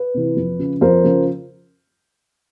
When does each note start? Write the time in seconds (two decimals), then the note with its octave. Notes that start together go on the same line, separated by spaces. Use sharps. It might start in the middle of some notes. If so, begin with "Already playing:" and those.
Already playing: B4
0.14 C3 E3
0.36 F2
0.59 C#3 F3
0.81 F2 A#4 C5
1.04 C#3 F3